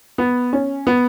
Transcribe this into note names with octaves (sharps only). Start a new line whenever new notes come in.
B3
C#4
B3